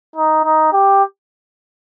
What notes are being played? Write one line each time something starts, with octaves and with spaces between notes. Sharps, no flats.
D#4
D#4
G4